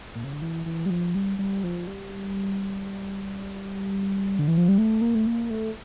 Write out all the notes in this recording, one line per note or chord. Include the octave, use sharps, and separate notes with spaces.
A#2
C#3
D3
E3
E3
G3
F3
G3
G3
F3
G3
D3
E3
F3
G3
A3
A#3
A3
A#3
A3